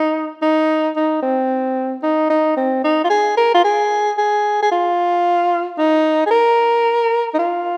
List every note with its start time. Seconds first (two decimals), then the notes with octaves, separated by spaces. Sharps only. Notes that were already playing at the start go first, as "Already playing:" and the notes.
Already playing: D#4
0.42 D#4
0.96 D#4
1.22 C4
2.03 D#4
2.30 D#4
2.57 C4
2.84 D#4
3.04 F4
3.10 G#4
3.37 A#4
3.54 F4
3.64 G#4
4.18 G#4
4.62 G#4
4.71 F4
5.78 D#4
6.26 G#4
6.31 A#4
7.34 D#4
7.39 F4